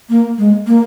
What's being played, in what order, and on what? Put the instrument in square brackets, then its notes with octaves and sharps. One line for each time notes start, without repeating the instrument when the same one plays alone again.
[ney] A#3
G#3
A#3